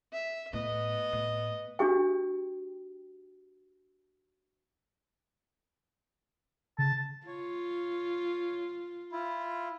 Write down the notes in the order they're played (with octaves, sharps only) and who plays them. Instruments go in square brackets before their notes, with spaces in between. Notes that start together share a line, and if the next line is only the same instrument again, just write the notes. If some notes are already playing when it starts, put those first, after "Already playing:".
[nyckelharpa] E5
[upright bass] A2 [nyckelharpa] B3 D#5
[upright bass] A2
[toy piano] D4 F#4 G4 G5
[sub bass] C#3 [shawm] A5
[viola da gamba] F4 [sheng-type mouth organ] C#5
[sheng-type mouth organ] E4 F4